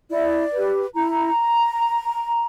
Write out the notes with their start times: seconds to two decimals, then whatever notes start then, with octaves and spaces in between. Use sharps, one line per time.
0.10 E4 D5
0.53 G4 B4
0.94 E4 A#5